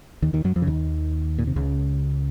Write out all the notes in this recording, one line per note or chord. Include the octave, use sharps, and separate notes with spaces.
D#2 D#3
D#2 D#3
F#2 F#3
F2 F3
C#3
D#2 D#3
A#2
C3
C#2 C#3